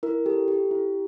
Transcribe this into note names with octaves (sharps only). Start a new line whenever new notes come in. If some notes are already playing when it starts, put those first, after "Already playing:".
E4 A#4
G4 A4
G4
E4